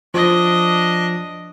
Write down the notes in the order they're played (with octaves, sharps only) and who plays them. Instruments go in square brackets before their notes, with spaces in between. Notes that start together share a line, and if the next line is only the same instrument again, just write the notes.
[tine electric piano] F3 [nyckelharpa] D4 D#5